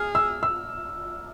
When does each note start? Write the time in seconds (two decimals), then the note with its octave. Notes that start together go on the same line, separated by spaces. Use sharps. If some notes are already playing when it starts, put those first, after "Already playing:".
Already playing: G#4 F6
0.15 E6
0.43 E6